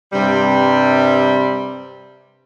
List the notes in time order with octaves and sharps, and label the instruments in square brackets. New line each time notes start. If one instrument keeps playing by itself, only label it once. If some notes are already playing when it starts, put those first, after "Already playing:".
[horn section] G2 C3 G3